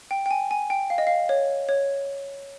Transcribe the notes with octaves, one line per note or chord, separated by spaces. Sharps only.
G5
G5
G#5
G#5
G5
F5
D#5
F5
C#5
C#5